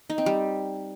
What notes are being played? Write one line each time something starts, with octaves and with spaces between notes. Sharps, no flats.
D#4
C4
G3